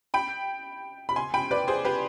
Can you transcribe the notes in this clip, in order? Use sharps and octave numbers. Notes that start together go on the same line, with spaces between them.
G5 B5
B5
G#5 C6
G5 B5
B4 D5
G#4 C5
G4 B4